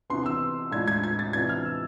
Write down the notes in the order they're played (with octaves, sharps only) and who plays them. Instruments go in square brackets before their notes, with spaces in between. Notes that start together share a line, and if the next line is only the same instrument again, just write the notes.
[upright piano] C3 E3 B3 C6
E6
A2 G#3 D4 F4 G#6
G#6
G#6
A6
C3 E3 B3 D4 F4 G#6
F6
E6